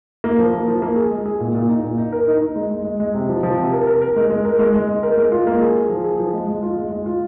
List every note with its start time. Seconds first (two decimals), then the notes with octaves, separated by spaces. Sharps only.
0.24 A#3
0.39 F3
0.53 A#3
0.67 F3
0.82 A#3
0.96 G#4
1.11 G#3
1.26 G#4
1.40 A#2
1.54 A#2
1.69 D#4
1.83 A#2
1.98 D#4
2.12 A#4
2.27 D#4
2.41 D#4
2.56 G#3
2.71 G#3
2.85 G#3
3.00 G#3
3.14 C3
3.29 F3
3.43 F3
3.58 C3
3.73 A#4
3.87 A#4
4.02 A#4
4.16 G#3
4.30 G#3
4.45 A#4
4.59 G#3
4.74 G#3
4.89 G#3
5.03 A#4
5.17 G#3
5.32 F4
5.47 A#3
5.61 G#4
5.76 G#4
5.89 F3
6.04 G#4
6.19 F3
6.33 G#3
6.48 G#3
6.62 F4
6.77 G#3
6.91 G#3
7.06 F4